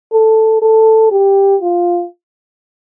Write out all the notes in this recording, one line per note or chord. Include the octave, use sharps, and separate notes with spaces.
A4
A4
G4
F4